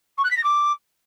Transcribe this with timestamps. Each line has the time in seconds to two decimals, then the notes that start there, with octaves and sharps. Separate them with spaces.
0.17 C#6
0.24 F#6
0.30 B6
0.37 A#6
0.43 D6